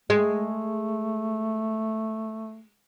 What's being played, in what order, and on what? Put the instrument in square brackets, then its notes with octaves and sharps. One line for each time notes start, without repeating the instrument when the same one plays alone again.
[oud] G#3 [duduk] A3